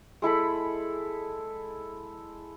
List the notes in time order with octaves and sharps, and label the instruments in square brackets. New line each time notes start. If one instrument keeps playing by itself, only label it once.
[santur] G#3 E4 A4 B5